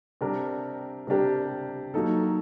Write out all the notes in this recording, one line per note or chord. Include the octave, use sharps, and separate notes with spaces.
C3 G3 D4 G4 A#4
C3 G3 D4 G4 A#4
F#3 A#3 D#4 A4